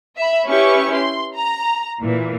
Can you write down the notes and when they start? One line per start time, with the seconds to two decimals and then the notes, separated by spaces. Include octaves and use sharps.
0.17 E5 B5
0.48 C#4 E4 G4 B4 C#6
0.94 C6
1.35 A#5
2.02 A#2 E3